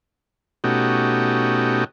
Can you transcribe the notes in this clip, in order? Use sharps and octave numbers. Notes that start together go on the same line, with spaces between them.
B2 A3 C#4 D#4 F#4 G4